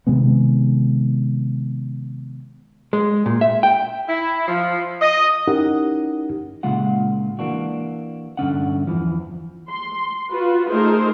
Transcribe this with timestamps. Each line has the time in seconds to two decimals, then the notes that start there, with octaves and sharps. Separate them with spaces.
0.07 C3 D#3 G#3 B3
2.93 G#3
3.26 A#2
3.41 E5
3.63 G5
4.09 E4
4.48 F3
5.01 D#5
5.47 C#4 D#4 E4 G4 A#4 F#5
6.63 A#2 C#3 G#3 F4 F#5
7.39 E3 A#3 D4 F#4
8.37 G2 D3 C#4 F#5
8.87 E2 E3 F3
9.69 C6
10.32 F4 F#4 B4
10.70 A3 D#4 G#4 A#4 C5